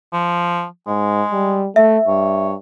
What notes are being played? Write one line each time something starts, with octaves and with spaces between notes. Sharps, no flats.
F3
G#2 G#3
G3
A3 E5
G2 C#5